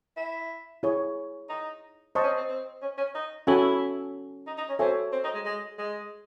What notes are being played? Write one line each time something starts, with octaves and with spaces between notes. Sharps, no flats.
E4
E4 G#4 C#5
D#4
C5 D#5 A5 C#6
C#4
C4
C4
C4
C#4
C#4
D#4
C#4 E4 F#4 A4 C#5 G#5
D#4
D#4
C#4
C4 F#4 A4 C#5 E5 G#5
C4
D#4
G#3
G#3
G#3